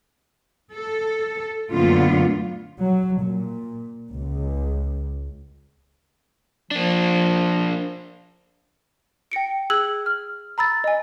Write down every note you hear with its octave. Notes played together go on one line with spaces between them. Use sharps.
A4
F#2 A#2 D3 A3 B3 F4
F#3
A#2
C#2
F3 A#3 D4
G5 A#6 C#7 D7
G#4 E6 F#6 G#6 F#7
F6
A#5 B5 E6 A6
D#5 G#5